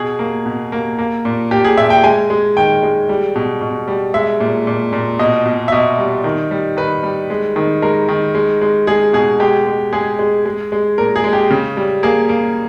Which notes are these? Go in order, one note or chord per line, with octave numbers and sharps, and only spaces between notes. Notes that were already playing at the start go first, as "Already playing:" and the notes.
Already playing: B2 G#4
A#3
B2
A#3
A#3
A#2
A#2 G4
G#4
A#2 E5
G5
G#3 G#5
G#3
D#3 G5
G#3
G3
B2
B2
G3
G#3 E5
A#2
A#2
A#2
B2 D#5
B2
E5
B2 D#5
G3
D#3
G3
D#3 B4
G3
G#3
D#3
G#3 A#4
D#3
G#3
G#3
G#3 G#4
B2 G#4
G#3 G4
G#3
G#3 G#4
G#3
G#3
G#3
A#2 A#4
G#4
G#3
G4
C#3
G3
A#3 G#4
A#3